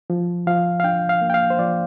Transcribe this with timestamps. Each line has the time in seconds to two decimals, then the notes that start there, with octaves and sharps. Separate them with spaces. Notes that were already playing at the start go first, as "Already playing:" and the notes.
0.10 F3
0.47 F3 F5
0.80 F5
0.84 D4 G5
1.09 F5
1.22 A#3
1.30 G5
1.34 F5
1.50 C5
1.59 F3 D5